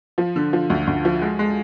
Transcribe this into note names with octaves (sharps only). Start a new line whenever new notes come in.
F3
D3
F3
D2
D2
F3
G#3
G#3